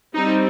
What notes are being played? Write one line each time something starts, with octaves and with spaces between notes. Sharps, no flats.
G3 C4 D#4